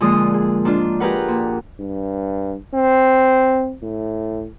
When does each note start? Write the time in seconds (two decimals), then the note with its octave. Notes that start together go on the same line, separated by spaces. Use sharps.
0.01 A#2 D3 F3 G#3 F4 D#6
0.34 G#4
0.65 G#2 D4 F4
1.00 F4 G4 G#4 A#4 B4 F#5
1.28 A#2
1.80 G2
2.75 C4
3.83 A2